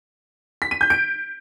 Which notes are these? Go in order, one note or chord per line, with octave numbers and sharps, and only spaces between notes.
B6
D#7
G6
D7